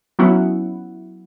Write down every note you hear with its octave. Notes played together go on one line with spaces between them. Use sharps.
F#3 B3 C#4 E4 F#5